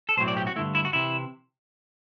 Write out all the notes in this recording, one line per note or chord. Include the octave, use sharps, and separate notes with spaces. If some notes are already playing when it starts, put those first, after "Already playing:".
A4
B1 A2 F#3 C4 C5
D5
G4
F#4
G2 D3 A3 E4
E4
F#4
C3 E3 E4